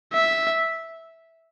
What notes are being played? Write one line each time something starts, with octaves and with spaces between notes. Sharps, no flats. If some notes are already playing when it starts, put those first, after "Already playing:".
E5